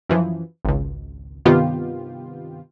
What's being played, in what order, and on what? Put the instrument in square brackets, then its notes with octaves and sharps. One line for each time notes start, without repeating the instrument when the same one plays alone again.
[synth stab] F#2 E3 F3
G#1 C#2
G2 C3 D#3 B3 F4 G4